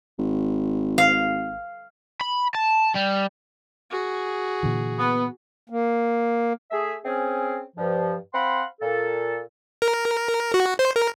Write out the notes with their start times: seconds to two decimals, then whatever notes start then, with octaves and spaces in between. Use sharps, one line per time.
0.18 G#1
0.98 F5
2.21 B5
2.55 A5
2.95 G3
3.90 F#4 G#4
4.63 A#2 D3 E3
4.99 B3
5.70 A#3
6.71 A3 G#4 E5
7.05 C4 C#4 G#4
7.76 G2 F3
8.33 C4 C5 F5 F#5 B5 C6
8.81 A#2 A4
9.82 A#4
10.54 F#4
10.79 C5
10.96 A#4